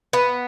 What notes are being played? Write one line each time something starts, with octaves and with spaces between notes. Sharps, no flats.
B3